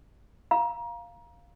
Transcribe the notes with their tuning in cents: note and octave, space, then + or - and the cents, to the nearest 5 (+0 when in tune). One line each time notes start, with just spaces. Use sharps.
F5 +0 A#5 +25